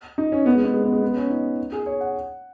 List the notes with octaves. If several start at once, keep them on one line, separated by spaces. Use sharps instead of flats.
D#4
C#4
B3
G#3
B3
G#3
B3
G#3
B3
C#4
D#4
G#4
C#5
F#5